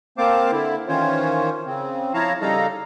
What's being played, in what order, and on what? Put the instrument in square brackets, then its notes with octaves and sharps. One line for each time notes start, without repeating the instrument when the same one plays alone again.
[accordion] A#3 C4 C5 F5 A5 D6
D3 E4
D#3 E3 C#4 F4 C5 C#5
C#3 C4
F3 E4 C#5 F5 A5 A#5
C#3 G3 D#4 A4 F5 A#5